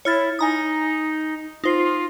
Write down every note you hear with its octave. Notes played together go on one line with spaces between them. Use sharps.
E4 C#5 F6 A6
D#4 G#5 A#5 D#6
D#4 F4 C5 C7